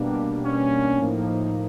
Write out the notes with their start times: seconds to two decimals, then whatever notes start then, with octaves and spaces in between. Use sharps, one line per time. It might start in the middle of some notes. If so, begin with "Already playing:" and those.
Already playing: B2 G3 A#3 D4
0.44 C#4
0.99 A2 F3 A#3 D#4